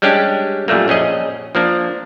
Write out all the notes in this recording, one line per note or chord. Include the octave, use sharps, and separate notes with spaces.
G3 G#3 C#4 D4 G4
F#2 A#2 G3 A3 A#3
A#1 C#4 G#4 D#5
F3 A#3 D4